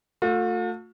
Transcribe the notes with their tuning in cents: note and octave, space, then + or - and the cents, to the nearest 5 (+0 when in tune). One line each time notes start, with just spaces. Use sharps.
A3 +25 F4 +45